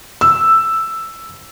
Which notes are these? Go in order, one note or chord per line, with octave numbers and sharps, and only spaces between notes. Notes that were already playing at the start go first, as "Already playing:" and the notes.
E6